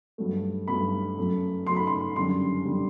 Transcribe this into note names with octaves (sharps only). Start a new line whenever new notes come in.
G2 F#3 A3
G2 F#3 A3 B5
F#2 F#3 A3
F#2 F#3 A3 C6
B5
C6
F#2 D3 G3 C6
D3 G3